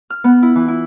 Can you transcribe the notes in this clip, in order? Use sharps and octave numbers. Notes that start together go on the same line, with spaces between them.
F6
B3
E4
E3
E4